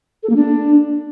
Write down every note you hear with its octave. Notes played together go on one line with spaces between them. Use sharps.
A4
A#3
D4